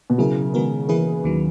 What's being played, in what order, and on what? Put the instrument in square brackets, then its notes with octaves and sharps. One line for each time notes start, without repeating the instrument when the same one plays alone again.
[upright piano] B2
[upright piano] C#3 [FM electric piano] F#3 C#4 E4 A#4
[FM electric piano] D#3 G#3 B3 F#4 A#4
E3 A#3 E4 G#4 B4
D#2 D#3 F#3